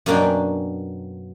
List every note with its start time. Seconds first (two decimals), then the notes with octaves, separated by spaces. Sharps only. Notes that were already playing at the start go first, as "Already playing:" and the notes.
0.06 F#2 B2 A#3 D4 G5 G#5